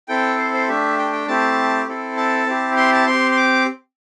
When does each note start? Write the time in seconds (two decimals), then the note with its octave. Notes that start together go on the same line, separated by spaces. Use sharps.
0.08 C4 E4 A4 G5
0.38 C5
0.54 C5
0.68 A3 D4 G4 E5
0.98 G5
1.13 G5
1.28 A3 C4 E4 G4 A5
1.88 C4 E4 A4
2.17 A5
2.47 C4 E4 G4
2.77 C6
2.92 A5
3.06 C4 G4 C6
3.31 C6
3.37 D6